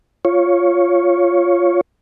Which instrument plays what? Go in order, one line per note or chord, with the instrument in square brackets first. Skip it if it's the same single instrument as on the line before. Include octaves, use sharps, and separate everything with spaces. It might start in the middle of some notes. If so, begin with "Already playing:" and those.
[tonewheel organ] F4 C#5